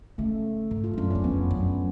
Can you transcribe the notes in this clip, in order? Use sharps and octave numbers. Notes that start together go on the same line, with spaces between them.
C#3 A3
G#2
F4
F2
F#2 D4
F#2 C#4
F2 B3
F#2